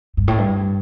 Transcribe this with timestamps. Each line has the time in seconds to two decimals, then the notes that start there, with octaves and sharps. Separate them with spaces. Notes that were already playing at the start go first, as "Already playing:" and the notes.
0.17 G2
0.28 A2
0.38 G2